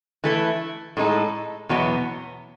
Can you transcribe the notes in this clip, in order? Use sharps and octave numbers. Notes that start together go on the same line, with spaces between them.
E3 A3 E4
A2 G#3 D#4 A4
E2 B2 F#3 B3